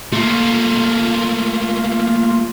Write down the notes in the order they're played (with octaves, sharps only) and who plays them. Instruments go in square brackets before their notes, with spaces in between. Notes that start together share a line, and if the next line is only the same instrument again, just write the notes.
[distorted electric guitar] A3 A#3 [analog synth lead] F4